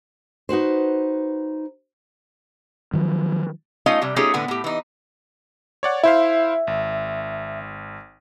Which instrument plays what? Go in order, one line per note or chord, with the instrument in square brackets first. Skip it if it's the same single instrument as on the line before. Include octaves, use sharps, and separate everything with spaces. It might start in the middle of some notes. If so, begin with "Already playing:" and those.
[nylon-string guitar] D#4 F#4 B4 C5
[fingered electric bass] D#3 F3 F#3
[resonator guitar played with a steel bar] A3 C#4 D#4 F4 D#5 F5
C3 G3
A3 C#4 D#4 F4 G4 G#4
A2 D3 B3 G#5
A2 G4
E3 D#4
[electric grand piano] C#5 D5 F#5
[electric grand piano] E4 C5 F5 [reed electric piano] E5
[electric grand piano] G#1